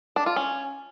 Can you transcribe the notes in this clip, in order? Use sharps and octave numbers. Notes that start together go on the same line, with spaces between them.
D4
F4
C#4